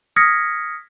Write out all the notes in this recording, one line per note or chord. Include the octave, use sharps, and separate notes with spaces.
D#6 F6 G#6 A#6 B6 C#7